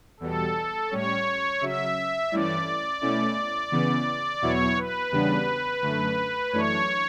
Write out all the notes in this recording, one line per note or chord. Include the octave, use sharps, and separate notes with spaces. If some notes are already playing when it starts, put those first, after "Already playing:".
E2 B2 G3 A4
A2 G3 C#4 C#5
C#3 F#3 C#4 E5
G2 E3 A3 C#4 E4 D5
B2 A3 C#4 E4
C#3 E3 B3
E2 B2 F#3 B3 E4 C#5
B4
E2 C#3 G3 B3 D4
F#2 D3 A3
F#2 E3 A3 D4 C#5